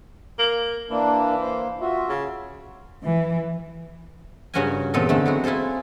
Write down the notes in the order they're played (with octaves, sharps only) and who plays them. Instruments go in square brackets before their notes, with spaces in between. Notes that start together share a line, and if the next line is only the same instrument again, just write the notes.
[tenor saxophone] A#3
[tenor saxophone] E3 [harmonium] A#3 D4
[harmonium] A#3 C5
F4 F#4 E5
[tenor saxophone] C#3
[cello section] E3
[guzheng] G2 C#3 C#4 F#4 A#4 G#5
E2 A#2 B3 C4 A4 D#5
D3 A3
F#3 G#3 F#4
E4 F4 G#4 A4 C5